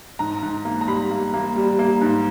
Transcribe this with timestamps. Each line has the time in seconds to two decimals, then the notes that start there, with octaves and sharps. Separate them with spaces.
0.19 G#2 A#5
0.43 G#2
0.65 A#3
0.81 A#5
0.87 G3 B5
1.11 A#3
1.34 A#3
1.56 G3
1.79 A#3
2.01 G#2